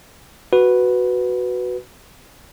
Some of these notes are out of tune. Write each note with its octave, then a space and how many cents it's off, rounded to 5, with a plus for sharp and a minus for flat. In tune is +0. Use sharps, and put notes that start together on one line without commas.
F#4 +0 B4 +0